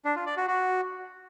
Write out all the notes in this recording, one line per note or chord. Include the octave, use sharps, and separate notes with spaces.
D4
F4
D5
F#4
F#4